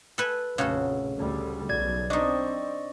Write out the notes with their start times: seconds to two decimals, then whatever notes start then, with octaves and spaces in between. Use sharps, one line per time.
0.18 A4 B4 G#5
0.58 F1 A#1 C#3 F#4 A4
1.19 D2 G3
1.69 B1 D5 G#6
2.10 C4 D4 D#4 D5 D#5 C#6